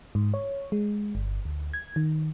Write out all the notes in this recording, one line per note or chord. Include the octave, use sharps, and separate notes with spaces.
G#2
C#5
G#3
G1
D2
G#6
D#3